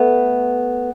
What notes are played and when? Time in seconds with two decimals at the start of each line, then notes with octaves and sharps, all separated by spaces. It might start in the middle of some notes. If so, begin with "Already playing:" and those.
Already playing: A3 B3